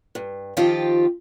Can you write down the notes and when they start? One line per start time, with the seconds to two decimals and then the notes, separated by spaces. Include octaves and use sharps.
0.15 G2
0.57 D#3 F3 C4 F4 G4